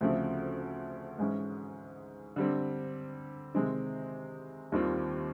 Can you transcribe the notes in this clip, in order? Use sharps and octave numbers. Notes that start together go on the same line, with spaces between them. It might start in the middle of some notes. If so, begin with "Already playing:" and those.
D2 C#3 F3 A3 C4
G#2 E3 G#3 C#4
D3 G3 C4
C3 D#3 G#3 C4 D#4
D#2 D#3 G3 C4 F4